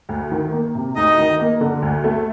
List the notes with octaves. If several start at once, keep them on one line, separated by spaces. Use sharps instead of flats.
D2
D#3
A#3
C3
D2 D#4 D#5
D#3
A#3
D3
D2
A3